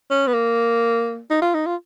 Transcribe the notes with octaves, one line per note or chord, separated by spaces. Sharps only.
C#4
B3
A#3
D#4
F4
D#4
F4